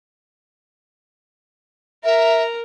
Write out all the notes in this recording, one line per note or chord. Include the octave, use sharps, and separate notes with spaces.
A#4 E5 A#5